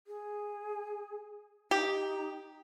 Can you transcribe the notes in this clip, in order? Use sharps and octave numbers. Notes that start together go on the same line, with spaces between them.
G#4
D#4 G4